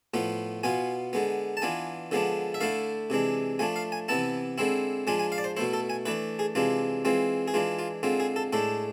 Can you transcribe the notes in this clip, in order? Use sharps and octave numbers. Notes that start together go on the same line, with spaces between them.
A2 F3 B3 F4
B2 B3 F4 G#5
D3 G#3 B3
A5
E3 B3 D4 F4 G#5
D3 F3 G#3 B3 D4
E5
D3 A3 E4 F5
C3 E3 G#3 D4
F3 A3 D4 G#5
F5
G#5
C3 E3 B3 E4 A5
D3 G#3 C4 E4
F3 G#3 D4 F4 G#5
G#5
F5
D5
C5
B2 A3 E4 C5
A4
G#5
E3 A3 D4 B4
G#4
C3 E3 G#3 D4 F4
E3 G#3 C4 F4
G#4
E3 G#3 D4 F4
F4
D3 G#3 C4 F4
G#4
A4
A2 G#3 D4 A4